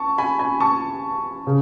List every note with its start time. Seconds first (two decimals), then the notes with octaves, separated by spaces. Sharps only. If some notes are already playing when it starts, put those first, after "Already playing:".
Already playing: A5 C#6
0.18 G#5 B5
0.39 G#5 B5
0.60 A5 C#6
1.47 C#3